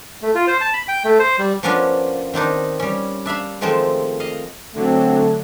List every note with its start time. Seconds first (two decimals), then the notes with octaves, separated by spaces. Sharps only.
0.22 A3
0.35 F4
0.47 C5
0.61 A5
0.73 B5
0.88 G5
1.05 A3
1.19 C5
1.39 G3
1.63 F3 A#3 B3 C#4 D4 F4
2.34 D#3 C4 D4 D#4
2.80 G3 C#4
3.26 D4 E5 F5 B5
3.61 D#3 F3 G#3 A3 C4
4.20 D#5 F5
4.75 D3 F#3 A3 C4